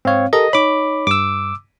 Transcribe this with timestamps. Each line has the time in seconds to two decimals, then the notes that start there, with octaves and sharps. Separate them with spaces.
0.05 G#2 C4 C#5 F5
0.33 G4 A4 A#4 D#5
0.53 D#4 C#5 B5 D6
1.07 G2 D6 E6